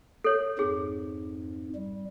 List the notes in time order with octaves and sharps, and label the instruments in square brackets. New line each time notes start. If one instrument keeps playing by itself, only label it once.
[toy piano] A4 C#5
[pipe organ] F2 G#2 [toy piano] G#4
[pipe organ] G3